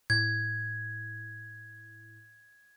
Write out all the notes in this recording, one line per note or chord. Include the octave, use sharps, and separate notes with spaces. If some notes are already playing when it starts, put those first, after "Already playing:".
A2 G#6